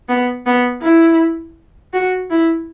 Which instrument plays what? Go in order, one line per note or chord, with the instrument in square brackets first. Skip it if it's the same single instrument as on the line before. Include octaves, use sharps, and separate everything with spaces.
[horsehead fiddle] B3
B3
E4
F#4
E4